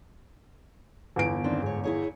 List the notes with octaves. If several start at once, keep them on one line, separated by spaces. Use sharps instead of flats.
G1 E2 D7
D#3 C4 D4
G#2 C#5
E4 G#4 C#5